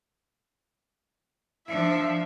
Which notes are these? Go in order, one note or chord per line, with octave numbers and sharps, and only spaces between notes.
F3 D4 E5